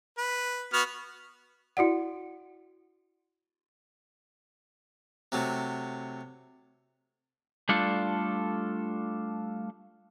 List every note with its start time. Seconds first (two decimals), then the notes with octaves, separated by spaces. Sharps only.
0.18 B4
0.73 B3 F#4 F6
1.77 E4 F#4 D5 F#5
5.32 C3 F#3 A3
7.69 G3 A3 D4 F4 A4